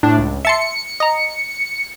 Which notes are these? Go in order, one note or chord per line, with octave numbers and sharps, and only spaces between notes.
A2 D4
C#2
E5 A5 C6 C#7
D#5 A#5